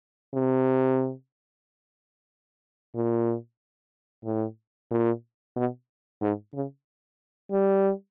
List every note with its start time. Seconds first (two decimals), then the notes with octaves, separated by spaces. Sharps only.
0.34 C3
2.95 A#2
4.24 A2
4.91 A#2
5.56 B2
6.21 G#2
6.54 C#3
7.52 G3